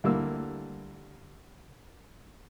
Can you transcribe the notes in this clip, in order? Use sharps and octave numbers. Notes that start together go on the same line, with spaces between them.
D2 G3 A#3 E4 E6